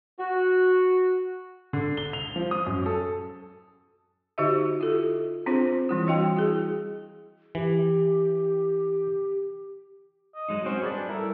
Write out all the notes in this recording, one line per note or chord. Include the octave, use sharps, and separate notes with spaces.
F#4
D3
G7
F7
F3
D#6
F#2
A4
D3 D#4 F#4 G4 D#5 E5
E4 F4 G4 A4
C4 D4 F4 G#4 C5
E3 G3 E4
D4 F#4 D#5 F5 G5 C6
E4 F#4 G#4
E3 G4
D#5
F#3 G#3 D#4
C4 C#4 F#4 C5
G3 D4 G#4 B4 D5
E4 A4 A#4